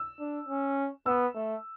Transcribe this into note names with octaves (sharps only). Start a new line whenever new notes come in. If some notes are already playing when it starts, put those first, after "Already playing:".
Already playing: E6
D4
C#4
B3 E6
A3